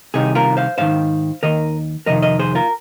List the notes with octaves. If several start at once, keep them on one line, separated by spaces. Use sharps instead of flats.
C2 C3 D#3 D#4 G#4
F4 A#4
C5 F5
G#2 D#3 C5 F5
D#2 D#3 A#4 D#5
F2 C3 D#3 A#4 D#5
A#4 D#5
G#4 C5
F4 A#4